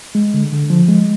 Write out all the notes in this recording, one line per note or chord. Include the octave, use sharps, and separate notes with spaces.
G#3
D3
D3
F3
G#3